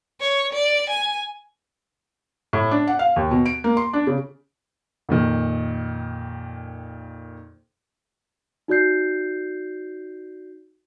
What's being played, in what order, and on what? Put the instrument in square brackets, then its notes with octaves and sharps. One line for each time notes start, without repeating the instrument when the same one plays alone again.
[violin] C#5
D5
G#5
[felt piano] A2
D4
F#5
F5
D#2
B2
D7
A#3
C6
D4
C#3
[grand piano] F2 A#2 D#3
[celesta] D#4 F#4 D5 G6 C7